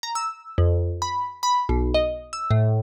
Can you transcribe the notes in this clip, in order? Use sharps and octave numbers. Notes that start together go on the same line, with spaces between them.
A#5
E6
F2
B5
B5
B1
D#5
E6
A2